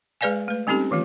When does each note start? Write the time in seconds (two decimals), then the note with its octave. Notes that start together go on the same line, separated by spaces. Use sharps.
0.21 G#3 G#4 B4 D5 F5 G#5
0.48 A3 B4
0.67 G3 C4 C#4 D#4 G4 A4
0.91 D#3 E3 A3 F4